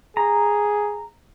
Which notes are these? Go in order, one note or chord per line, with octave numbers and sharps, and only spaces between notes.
G#4 A#5